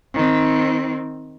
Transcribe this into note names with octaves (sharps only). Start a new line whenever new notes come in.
D#3 C4